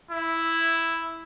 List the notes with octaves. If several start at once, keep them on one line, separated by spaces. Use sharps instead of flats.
E4